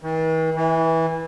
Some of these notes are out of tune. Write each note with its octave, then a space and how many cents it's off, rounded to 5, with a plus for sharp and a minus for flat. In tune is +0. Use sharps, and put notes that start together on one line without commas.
E3 -45
E3 -15